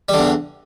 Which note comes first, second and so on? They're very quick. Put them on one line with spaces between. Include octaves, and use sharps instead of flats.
G3 D3 E2